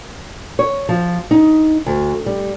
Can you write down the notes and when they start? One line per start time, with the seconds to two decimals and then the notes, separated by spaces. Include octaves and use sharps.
0.59 C#5
0.89 F3
1.31 D#4
1.86 D2
2.26 G3